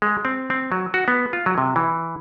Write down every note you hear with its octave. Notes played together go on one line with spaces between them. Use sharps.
G#3
C4
C4
F#3
F#4
B3
F4
F#3
C3
E3